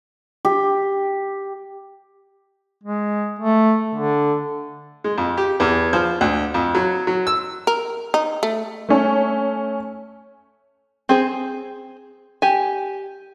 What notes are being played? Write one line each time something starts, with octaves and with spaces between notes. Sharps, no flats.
G4
G#3
A3
D3
G#3
F2
G4
E2
F3
D2
F2
F#3
F#3
E6
A#4
D#4
A3
A3 C#4
C4 G#4 C5
G4 G#5